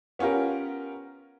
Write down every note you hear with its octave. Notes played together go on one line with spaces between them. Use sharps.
B3 C#4 F4 G4 A#4